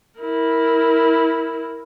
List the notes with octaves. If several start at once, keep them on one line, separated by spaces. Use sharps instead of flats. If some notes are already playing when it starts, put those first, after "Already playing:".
E4 A#4